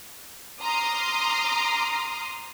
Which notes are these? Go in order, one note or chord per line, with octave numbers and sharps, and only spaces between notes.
A#5 C6 D6 D#6 F6